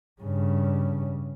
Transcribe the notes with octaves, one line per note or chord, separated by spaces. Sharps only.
G2 C#3